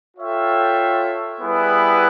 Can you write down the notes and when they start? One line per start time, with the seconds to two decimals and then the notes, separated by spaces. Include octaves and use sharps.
0.17 F4 A4 C#5 E5 G5
1.41 G3 B3 E4 G#4 B4